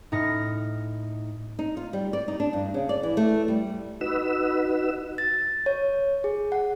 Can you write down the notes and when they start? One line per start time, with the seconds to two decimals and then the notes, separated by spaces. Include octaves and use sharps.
0.12 A2 D#4 F6 A#6 C#7
1.59 D#4
1.77 F4
1.93 G3
2.13 D5
2.28 D#4
2.40 D4
2.53 G2
2.74 C#3
2.89 D5
3.03 E3
3.17 A3
3.48 G3
4.01 D#4 F#4 B4 E6
5.18 A6
5.66 C#5
6.24 G#4
6.52 F#5